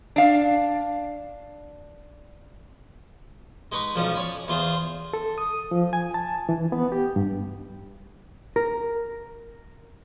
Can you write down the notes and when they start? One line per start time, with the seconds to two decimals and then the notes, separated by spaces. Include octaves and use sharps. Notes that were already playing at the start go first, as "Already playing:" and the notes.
0.16 D4 F5
3.72 G#3 D#4 B4 C#6
3.96 B1 F3 C#4 D5 D#6
4.15 C#5 D5 G#5 B5
4.48 E2 F4 G#4 C5
5.13 A4
5.38 D#6
5.71 F3
5.93 G#5
6.14 A5
6.49 E3
6.72 B3
6.92 G4
7.16 G2
8.56 A#4